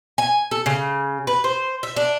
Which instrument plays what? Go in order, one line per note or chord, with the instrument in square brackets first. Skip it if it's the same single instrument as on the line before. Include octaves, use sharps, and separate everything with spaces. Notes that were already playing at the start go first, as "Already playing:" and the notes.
[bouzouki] G#5
A4
C#3
B4
C5
E5
D4